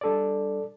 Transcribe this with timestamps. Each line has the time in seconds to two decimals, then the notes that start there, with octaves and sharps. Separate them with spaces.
0.01 G3 D4 A4 D5